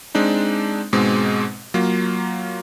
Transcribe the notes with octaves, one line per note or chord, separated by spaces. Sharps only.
G#3 C4 D4 D#4
G#2 B2 G#3 C4
F#3 A#3 F4